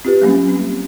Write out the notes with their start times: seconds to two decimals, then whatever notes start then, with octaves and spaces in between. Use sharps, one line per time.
0.05 C4 F4 G4 B4
0.22 F#3 G3 A#3 C4 C#4
0.49 C4